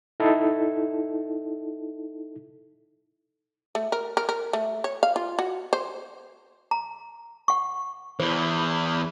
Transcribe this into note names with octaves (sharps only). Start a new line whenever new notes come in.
D#4 E4 A4
A3
A#4
A#4
A#4
A3
C#5
F5
F4
F#4
C5
A#5
F#5 C#6
E2 E3 C5